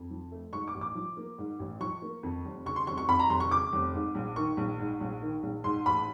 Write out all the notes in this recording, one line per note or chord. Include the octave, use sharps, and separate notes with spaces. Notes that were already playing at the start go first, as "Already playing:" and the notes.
Already playing: F2
F3
A3
G#2 C#6
D6
A1
D6
F3
A#3
G#2
A1
F3 C#6
A#3
F2
F1
C#3 C#6
C6
F1 C#6
C#6
F2 B5
A#5
F1 C6
C#6
C#3 D6
F1
G#2
A#1
D#3 C#6
A#1
G#2
A#1
D#3
A#1
G#2 C6
A1 B5